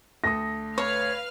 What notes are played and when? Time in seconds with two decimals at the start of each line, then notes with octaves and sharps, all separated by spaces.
0.24 D2 A4 D#6 A#6
0.78 B4 C#5 F5 F6